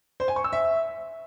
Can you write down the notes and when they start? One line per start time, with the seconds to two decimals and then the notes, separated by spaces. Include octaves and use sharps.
0.20 C5
0.28 G#5
0.36 C#6
0.44 E6
0.53 E5